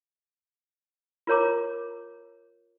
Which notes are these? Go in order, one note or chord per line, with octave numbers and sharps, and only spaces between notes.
F4 A#4 C#5 A#5 D6